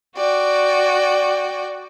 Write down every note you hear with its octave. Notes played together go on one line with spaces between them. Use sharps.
F#4 D5 G5